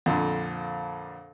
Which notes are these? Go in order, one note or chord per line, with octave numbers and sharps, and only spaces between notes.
F2 A#2 D3